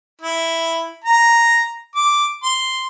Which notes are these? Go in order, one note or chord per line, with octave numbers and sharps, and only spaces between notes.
E4
A#5
D6
C6